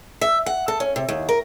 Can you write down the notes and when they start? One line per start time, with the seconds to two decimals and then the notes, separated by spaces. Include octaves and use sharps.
0.21 E5
0.46 F#5
0.68 A4
0.80 C#4
0.96 C3
1.09 D#2
1.29 A#4